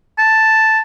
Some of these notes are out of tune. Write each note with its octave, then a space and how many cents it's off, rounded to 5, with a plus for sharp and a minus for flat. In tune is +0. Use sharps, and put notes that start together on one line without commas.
A5 +0